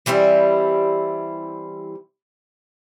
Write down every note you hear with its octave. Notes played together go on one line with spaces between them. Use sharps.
E3 G3 C4 E4